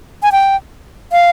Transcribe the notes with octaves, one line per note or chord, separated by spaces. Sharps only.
G#5
G5
F5